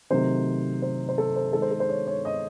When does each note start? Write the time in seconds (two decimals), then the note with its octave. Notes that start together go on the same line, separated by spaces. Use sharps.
0.10 C3 D#3 F#3 A3 C5
0.82 C5
1.09 C5
1.18 A4
1.36 C5
1.53 D#3 G#3 A4
1.62 C5
1.71 A4
1.80 C5
1.89 C#5
2.07 C#5
2.25 D#5